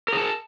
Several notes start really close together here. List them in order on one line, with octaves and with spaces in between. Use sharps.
A#4 G#4 A5